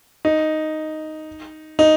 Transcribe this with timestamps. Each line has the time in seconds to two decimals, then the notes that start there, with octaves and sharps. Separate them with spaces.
0.25 D#4
1.79 D#4